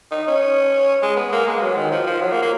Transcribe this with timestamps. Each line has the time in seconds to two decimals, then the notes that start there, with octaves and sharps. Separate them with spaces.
0.11 D#4
0.27 C#4
1.02 G#3
1.16 B3
1.32 A#3
1.47 G#3
1.61 F#3
1.77 D#3
1.91 F3
2.07 F3
2.21 F#3
2.32 A#3
2.42 A#3